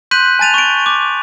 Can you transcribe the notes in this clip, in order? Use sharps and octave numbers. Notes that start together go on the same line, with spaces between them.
C6 F#6 G6 B6 D#7 F#7
G#5 A5 A6 D#7 F7
C#6 D7
D6